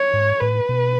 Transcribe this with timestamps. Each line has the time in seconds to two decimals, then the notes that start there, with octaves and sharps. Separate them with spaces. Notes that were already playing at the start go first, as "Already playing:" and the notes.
Already playing: C#5
0.13 G#2
0.41 A2 B4
0.69 B2